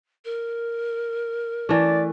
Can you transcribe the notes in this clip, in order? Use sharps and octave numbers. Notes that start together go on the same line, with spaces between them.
A#4
E3 A3 D5